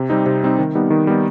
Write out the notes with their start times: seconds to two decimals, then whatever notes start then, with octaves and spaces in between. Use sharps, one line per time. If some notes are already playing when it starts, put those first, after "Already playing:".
Already playing: C3
0.10 G3 C4 D#4
0.26 C3
0.43 G3 C4 D#4
0.59 D#3
0.75 G3 B3 D#4
0.90 D#3
1.07 G3 B3 D#4